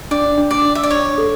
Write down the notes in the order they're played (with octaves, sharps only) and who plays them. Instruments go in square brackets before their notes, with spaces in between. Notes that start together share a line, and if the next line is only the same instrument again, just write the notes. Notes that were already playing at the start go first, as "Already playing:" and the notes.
[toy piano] D4 [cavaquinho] D5
[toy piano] D4
[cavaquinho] D5
[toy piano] D4
[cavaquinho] E5
D5
[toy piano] D4 [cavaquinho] C#5
[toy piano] A4